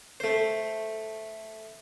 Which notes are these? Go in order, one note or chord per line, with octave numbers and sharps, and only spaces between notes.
A3 C5